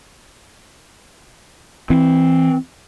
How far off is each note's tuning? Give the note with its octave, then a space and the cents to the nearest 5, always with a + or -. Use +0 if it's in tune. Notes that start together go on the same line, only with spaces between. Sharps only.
E3 -10 C4 +0